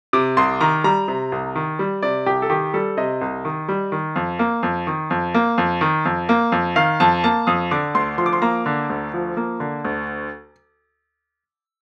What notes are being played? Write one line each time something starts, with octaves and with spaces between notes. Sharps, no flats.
C3 D6
C2 C6
D#3 A#5
G3 A#5
C3
C2
D#3
G3
C3 D5
C2 G4
A4
D#3 G4
G3 A4
C3 D#5
C2
D#3
G3
D#3
F2
A#3
F2
D#3
F2
A#3
F2
D#3
F2
A#3
F2
D#3 F5
F2 A5
A#3 A5
F2 D#6
D3 D6
D2 C6
F3 C6
D6
C6
A#3 A#5
D3
D2
F3
A#3
D3
D2